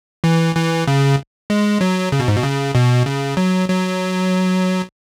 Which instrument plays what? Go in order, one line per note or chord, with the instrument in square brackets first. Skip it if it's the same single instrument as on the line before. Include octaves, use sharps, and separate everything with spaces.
[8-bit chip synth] E3
E3
C#3
G#3
F#3
C#3
B2
G#2
B2
C#3
B2
C#3
F#3
F#3